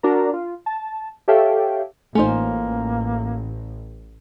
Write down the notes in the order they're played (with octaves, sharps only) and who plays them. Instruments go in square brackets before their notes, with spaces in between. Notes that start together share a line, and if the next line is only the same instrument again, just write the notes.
[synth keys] D4 F#4 A#4 A#5
F4
A5
G4 A4 C#5 E5 F5 G5
[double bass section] A1 [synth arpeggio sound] A3 D#4 [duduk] A#3 [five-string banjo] C#4 F4 C5